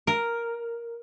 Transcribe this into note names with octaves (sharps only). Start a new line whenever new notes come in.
A#4